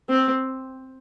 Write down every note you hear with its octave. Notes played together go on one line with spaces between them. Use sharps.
C4